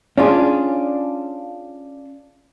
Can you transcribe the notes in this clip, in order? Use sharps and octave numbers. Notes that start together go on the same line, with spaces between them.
C#4 D4 F4 G#4